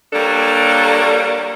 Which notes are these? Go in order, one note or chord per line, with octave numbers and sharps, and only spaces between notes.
F#3 G3 A#3 D4 A4